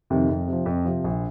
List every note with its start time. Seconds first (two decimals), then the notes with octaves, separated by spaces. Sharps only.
0.10 F2 C3 D#3
0.29 F2
0.47 C3
0.53 F3
0.66 F2
0.85 C3 F3
1.04 A#1